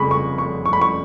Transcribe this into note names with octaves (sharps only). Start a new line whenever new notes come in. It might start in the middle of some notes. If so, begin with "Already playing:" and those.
Already playing: F1 F2 C#3 G#3 B5 C#6
C#6
C#6
C#6
B5
C#6